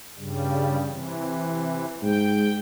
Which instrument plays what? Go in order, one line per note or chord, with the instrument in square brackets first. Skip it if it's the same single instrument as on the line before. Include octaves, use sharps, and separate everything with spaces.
[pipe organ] G2 C#3 G3
C3 E3
[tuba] G#2 [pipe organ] G5